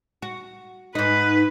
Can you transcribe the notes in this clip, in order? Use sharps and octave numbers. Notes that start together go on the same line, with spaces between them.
F#4
G#2 D#4 B4